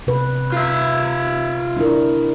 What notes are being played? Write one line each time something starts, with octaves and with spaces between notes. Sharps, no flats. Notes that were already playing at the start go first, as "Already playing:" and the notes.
C3 B4
F4 E5
D4 E4 A#4